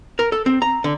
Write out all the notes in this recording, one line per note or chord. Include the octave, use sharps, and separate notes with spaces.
A#4
A4
C4
A#5
D3